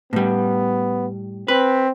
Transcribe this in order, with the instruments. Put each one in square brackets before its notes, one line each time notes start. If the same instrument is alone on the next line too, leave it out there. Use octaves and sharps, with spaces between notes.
[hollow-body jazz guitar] A2 G3 [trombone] B3
[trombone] C4 [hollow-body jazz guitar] B4